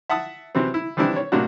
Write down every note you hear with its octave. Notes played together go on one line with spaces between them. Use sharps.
E5 F#5 A5 D#6
C3 E3 F#3 C4
E4
D#3 E3 G3 C4 D4 E4
C#5
A2 C3 F#3 A#3 D4 F#4